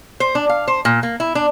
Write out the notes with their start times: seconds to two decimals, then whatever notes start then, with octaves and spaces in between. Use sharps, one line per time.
0.20 C5
0.35 D4
0.49 F5
0.68 C5
0.85 A#2
1.03 A#3
1.20 E4
1.35 D4